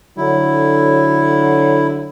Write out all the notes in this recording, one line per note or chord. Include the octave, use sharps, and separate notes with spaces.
D3 F#3 E4